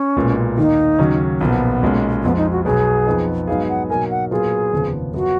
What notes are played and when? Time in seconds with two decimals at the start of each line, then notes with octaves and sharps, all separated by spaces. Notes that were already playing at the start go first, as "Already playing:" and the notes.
Already playing: C#4
0.16 B1 A#2 G#3 B3
0.57 D#2 D#3 A#3 D#4
0.99 D#2 C#3 F#3 C#4
1.40 B1 A#2 F3 B3
1.82 B1 A#2 G#3 C#4
2.23 F2 F3 G#3 B3
2.37 D#4
2.52 F#4
2.65 B1 B2 F#3 B3 G#4
3.07 F2 F3 B3 D#4
3.47 G#2 F#3 B3 D#4 G#4 F5
3.69 F#5
3.89 B2 F#3 A#3 D#4 A#4 G#5
4.11 F#5
4.31 A#2 F#3 B3 F4 G#4 A#4
4.73 F1 D#2 C#3 F3 B3
5.14 F#2 F3 B3 F#4